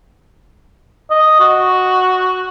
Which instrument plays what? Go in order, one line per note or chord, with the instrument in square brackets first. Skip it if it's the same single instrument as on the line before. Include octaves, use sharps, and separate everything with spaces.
[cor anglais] D#5
F#4